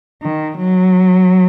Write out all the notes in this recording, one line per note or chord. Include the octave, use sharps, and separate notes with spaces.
D#3
F#3